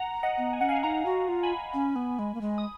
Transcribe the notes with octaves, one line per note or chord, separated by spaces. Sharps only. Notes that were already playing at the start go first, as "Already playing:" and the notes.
Already playing: F#5 A#5
D#5 F#5
B3
G#5
C#4 F#5
F5 G#5
D#4 F#5 A#5
F#4
F4
G#5 B5
C#4
B3
G#3
A#3
G#3
D#6